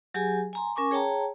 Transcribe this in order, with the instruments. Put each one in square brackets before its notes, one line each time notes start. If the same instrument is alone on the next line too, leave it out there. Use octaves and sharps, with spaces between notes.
[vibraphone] F#3 G4 G#4 G#5
G#5 A#5 C6
C#4 A#4 G#5 C#6 D6
G#4 C#5 G5 A5 A#5